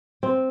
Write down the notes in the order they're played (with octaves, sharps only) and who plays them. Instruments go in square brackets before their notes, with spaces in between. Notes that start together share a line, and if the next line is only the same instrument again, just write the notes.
[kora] C4